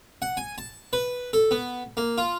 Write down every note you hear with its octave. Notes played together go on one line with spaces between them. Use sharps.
F#5
G#5
A5
B4
A4
B3
A#3
F4